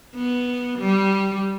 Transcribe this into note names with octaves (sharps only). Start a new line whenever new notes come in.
B3
G3